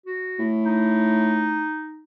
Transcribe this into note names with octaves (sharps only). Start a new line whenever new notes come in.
F#4
A2
D#4